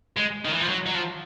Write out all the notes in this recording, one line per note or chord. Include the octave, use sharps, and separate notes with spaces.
G#3
D#3
E3
F3
F#3
F#3
F3